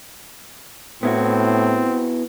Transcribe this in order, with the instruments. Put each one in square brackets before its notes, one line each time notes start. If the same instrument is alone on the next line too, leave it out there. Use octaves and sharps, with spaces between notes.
[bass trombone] A2 [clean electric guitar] B3 E4 F#4 [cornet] C4